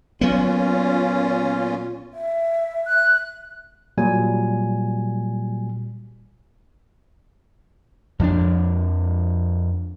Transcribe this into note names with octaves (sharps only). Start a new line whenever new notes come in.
A#2 F#3 B3 C#4 F4
E5
F#6
A#2 F#3 G3 G#5
F2 F3 C4 D4